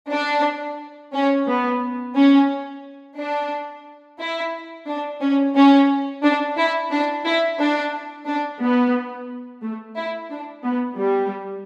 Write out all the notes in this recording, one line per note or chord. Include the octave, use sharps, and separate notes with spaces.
D4
C#4
B3
C#4
D4
E4
D4
C#4
C#4
D4
E4
D4
E4
D4
D4
B3
A3
E4
D4
B3
G3